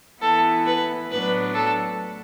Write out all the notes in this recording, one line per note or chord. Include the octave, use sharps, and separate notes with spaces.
E3 B3 E4 A4
B4
A2 F#3 B3 D4 B4
A4